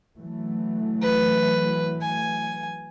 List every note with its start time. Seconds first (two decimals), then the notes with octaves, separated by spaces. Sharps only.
0.17 E3 F#3 A3
1.02 B4
2.01 G#5